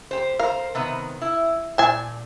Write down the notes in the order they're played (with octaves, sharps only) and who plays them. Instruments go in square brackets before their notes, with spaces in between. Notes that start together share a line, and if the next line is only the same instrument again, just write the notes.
[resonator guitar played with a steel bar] G4 C5
[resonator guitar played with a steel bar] A#4 C5 [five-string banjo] F5
[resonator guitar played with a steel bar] C3 D#3 B3
E4
[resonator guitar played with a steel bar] A#2 [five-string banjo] G#5 A5